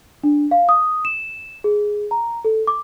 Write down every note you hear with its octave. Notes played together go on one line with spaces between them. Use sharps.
D4
F5
D#6
E7
G#4
A#5
A4
D6